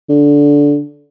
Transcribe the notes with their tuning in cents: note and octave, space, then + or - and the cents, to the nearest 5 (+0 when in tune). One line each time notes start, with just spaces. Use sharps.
D3 -15